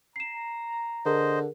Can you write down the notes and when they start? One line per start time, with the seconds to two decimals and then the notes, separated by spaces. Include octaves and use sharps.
0.16 A#5 C7 E7
1.06 D3 G#4 A#4 C5 D#5